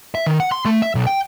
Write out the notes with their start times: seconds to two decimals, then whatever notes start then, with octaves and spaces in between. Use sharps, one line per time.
0.15 E5
0.26 D#3
0.40 F#5
0.52 C6
0.65 A3
0.82 E5
0.95 B1
1.07 G5